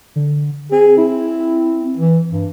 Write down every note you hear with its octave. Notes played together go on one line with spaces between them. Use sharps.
D3
C4 G#4
E4
E3
G2